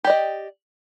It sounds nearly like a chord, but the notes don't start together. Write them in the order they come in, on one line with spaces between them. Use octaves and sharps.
G4 D5 D#5